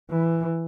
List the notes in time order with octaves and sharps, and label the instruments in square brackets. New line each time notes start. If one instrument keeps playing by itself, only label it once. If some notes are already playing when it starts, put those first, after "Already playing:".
[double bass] E3